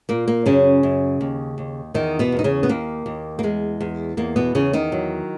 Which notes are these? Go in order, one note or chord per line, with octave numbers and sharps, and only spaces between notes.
A#2 A#3
A#3
F#2 C#3 C#4
F#2
D#2
D#2
E2 D#3 D#4
B2 B3
E2
D#4
C#3 C#4
B3
D#2 A#3
D#2
A#3
E2 G#3
E2
E2 A#3
B2 B3
E2 C#3 C#4
D#3 D#4
F#3